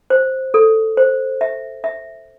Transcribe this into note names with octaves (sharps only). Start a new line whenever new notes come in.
C5
A4
C5
E5
E5